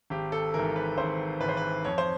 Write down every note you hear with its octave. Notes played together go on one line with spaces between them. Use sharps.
G#1 G4
A4
G#2 E3 A#4
B4
G#1 C5
G#2 E3 B4
C5
B4
F2 C#5
C5